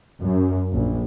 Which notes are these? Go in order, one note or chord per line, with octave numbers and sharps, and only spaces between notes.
F#2
A#1